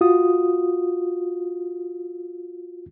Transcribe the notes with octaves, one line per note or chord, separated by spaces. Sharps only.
F4 F#4 D#6